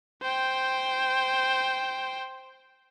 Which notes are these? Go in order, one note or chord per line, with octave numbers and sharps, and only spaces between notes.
C5 G5